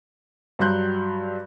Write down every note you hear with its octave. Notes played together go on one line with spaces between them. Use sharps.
G2 F#3 G3 C6 F#6 G6